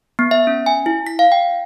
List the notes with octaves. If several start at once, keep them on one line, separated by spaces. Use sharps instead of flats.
B3
E5
C#4
G#5
E4
B6
F5
G5